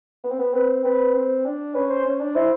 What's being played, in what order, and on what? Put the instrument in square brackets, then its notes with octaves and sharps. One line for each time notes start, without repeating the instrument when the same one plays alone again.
[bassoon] B3
C4
B3
[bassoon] C4 [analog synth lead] B4
[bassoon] C4 [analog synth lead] B4
[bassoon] C4
D4
[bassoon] C#4 [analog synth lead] B4
[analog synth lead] C5
[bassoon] C#4
D4
[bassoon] E4 [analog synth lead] C5